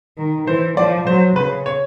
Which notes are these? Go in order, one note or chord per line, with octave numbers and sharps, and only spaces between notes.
D#3
E3 C5
F3 D5
F#3 C5
C#3 B4
C#5